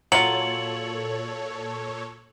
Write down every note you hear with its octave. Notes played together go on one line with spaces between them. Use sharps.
A#2 F#3 F4 A4 C#5 C#7 F#7